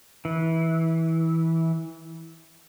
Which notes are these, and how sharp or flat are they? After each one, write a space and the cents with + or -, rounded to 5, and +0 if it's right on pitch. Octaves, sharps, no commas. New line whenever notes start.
E3 -15